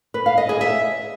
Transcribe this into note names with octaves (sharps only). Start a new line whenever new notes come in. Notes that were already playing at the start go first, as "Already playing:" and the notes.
B4
F5
D#5
G#4
E5